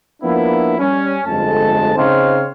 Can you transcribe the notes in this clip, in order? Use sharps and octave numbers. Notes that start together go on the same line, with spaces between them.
F3 A#3 B3 D4 E4
G3 C#4
G1 F2 G#3 A3 A5
C#3 C4 D#4 C5 C#5 F5